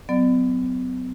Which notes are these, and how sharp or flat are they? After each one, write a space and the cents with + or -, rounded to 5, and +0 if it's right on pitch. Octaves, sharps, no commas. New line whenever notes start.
F#3 +0 B3 +40 D5 +35